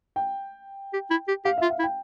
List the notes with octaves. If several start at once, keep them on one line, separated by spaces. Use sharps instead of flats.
G5
G4
E4
G4
G4 F5
F4 E5
F5
E4
G5